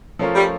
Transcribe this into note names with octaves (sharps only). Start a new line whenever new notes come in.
F3 A3 C#4 F4 A#4
G3